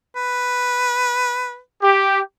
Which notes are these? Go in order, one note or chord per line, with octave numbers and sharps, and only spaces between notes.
B4
G4